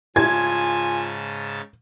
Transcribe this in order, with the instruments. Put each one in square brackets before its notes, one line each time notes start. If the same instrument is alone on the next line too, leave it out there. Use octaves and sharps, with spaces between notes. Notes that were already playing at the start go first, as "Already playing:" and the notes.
[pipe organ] G#2 C#3 A5 [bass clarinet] F4 [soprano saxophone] G#5 [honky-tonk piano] G#6